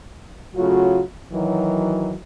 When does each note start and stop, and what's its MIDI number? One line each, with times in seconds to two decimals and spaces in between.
0.56 1.02 49
0.56 1.02 54
0.56 1.02 57
0.56 1.02 65
0.56 1.02 66
1.32 2.14 51
1.32 2.14 52
1.32 2.14 54